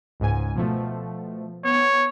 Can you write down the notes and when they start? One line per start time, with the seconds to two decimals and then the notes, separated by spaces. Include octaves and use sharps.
0.20 C#2 G#2 G#5
0.55 B2 F3 A3
1.64 B3 C#5